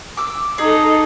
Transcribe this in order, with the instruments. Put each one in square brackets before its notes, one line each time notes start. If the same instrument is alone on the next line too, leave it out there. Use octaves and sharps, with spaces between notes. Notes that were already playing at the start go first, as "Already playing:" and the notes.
[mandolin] D6 E6
[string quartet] D#4 A4 [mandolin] G#4